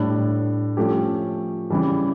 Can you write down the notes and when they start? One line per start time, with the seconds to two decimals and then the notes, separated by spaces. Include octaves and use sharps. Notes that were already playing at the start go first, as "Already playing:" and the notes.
Already playing: A2 G3 D4
0.77 F3 A3 C#4 G4
1.70 C#3 E3 G3